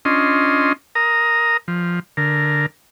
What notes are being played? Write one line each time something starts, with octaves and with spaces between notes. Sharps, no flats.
C#4 D4 F4 D#5 C6
A#4 A#5 D#6
F3
D3 A#4